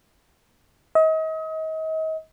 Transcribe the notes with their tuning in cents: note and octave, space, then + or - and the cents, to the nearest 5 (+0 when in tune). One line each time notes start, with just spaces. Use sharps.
D#5 +35